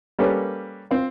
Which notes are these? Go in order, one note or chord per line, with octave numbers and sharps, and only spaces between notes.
G3 A#3 C#4 G4 A4 B4
C4 F4